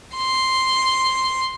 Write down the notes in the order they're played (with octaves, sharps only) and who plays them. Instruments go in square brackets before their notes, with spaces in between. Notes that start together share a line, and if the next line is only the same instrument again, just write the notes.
[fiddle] C6